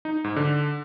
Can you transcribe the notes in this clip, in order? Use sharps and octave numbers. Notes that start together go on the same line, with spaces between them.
D#4
G#2
D3